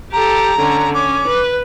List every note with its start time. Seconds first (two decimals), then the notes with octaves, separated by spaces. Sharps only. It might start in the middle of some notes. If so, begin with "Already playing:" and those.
0.12 G4 A4 A#5
0.58 D3 C#4
0.93 C#4 D6
1.27 B4